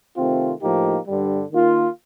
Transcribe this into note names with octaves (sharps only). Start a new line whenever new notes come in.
C3 D#3 A3 C4 F4
A2 F3 A#3 D#4 G4
G2 D3 G3
D#3 A#3 F4